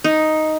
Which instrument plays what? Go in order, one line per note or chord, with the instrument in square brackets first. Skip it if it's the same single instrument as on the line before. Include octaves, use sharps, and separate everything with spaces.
[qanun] D#4